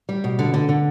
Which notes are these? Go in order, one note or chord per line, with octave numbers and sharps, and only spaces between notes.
G3
B2
D3
D3
D3